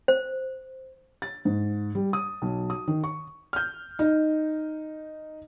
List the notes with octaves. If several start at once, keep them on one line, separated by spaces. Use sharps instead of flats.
C5
A6
G#2
G3
D#6
B1
D#6
D#3
C#6
F6 G6
D#4